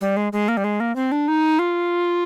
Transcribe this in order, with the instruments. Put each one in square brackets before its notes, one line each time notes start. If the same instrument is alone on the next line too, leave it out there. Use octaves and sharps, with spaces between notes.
[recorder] G3
G#3
G#3
A#3
G3
G#3
A#3
C4
D4
D#4
F4